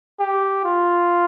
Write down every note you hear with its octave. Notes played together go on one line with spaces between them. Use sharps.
G4
F4